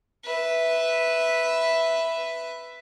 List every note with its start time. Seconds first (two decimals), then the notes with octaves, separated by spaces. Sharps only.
0.24 B4 E5